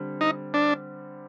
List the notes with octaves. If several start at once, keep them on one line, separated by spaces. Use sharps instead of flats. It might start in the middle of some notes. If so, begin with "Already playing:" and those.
Already playing: D3 G3 C4
D#4
D4